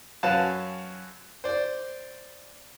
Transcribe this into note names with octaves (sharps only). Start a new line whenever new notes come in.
F#2 C#4 F#4 B4 F5 A5
C5 D5